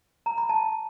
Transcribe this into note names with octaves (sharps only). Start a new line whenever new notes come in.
A#5
B5
A5